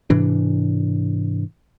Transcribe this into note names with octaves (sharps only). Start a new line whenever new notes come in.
G#2 C3 E3 D4